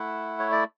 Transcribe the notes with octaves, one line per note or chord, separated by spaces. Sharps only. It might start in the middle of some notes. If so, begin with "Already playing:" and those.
Already playing: A3 E4 F#5
C#5
D5